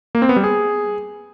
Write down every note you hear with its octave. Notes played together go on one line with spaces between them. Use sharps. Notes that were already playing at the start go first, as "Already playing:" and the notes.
A#3
C4
B3
G3
G#4